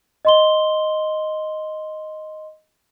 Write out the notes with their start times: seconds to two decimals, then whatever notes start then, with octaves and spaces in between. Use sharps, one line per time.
0.25 D#5 C6 G7